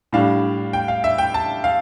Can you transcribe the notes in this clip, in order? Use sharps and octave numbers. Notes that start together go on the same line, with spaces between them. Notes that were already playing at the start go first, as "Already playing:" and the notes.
A2 G3 D4 F5
G5
F5
E5
G5
A5
F5